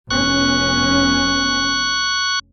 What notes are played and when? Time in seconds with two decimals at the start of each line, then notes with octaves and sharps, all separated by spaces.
0.10 F1 B3 C#4 C#6 F#6